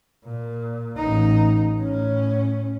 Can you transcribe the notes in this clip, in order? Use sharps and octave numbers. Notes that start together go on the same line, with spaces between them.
A#2
A1 D#4
A2 C#4